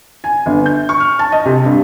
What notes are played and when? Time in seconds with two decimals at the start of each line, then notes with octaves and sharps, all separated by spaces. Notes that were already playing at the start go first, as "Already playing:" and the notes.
0.24 G#5
0.46 G1
0.66 G6
0.89 C#6
1.00 F6
1.19 A5
1.32 D#5
1.46 C3
1.65 G2